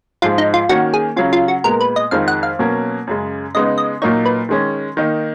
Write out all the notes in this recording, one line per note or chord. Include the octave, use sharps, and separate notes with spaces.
G#2 F3 G#3 F4
D#4
F4
D#3 A#3 C#4 F#4
G#4
C#3 F#3 C#4 F4
F4
F#4
A#2 G#3 B3 A#4
B4
D#5
F2 D#3 G#3 D#4 F5
F#5
F5
B2 F#3 A#3 C#4
F#2 C#3 G#3
C#3 G#3 B3 D#4 D#5
D#5
A#2 F#3 A#3 D#4 C#5
B4
D#3 G#3 C#4
D#3 A#3 D#4